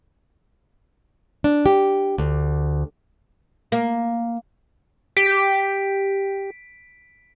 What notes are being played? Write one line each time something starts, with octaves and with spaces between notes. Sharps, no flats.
D4
G4
D2
A#3
G4 B6 D7